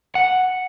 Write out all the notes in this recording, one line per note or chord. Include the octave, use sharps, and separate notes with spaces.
F#5